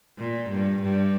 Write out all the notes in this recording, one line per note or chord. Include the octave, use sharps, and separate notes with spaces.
A#2
G2
G2